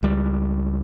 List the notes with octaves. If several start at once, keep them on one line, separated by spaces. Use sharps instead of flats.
C#2 G3